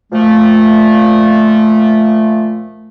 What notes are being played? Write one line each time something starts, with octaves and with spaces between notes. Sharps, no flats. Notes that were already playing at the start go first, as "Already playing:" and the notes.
A#2 F3 A3